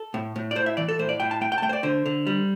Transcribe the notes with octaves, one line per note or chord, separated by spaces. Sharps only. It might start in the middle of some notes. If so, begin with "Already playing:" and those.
Already playing: A4
A2
A2
D5
A2 C5
E5
E3 D5
A4
A2 C5
D5
A2 G5
A5
A3 G5
G5
A5
A3 G5
C5
D5
D3 C5
D3
G3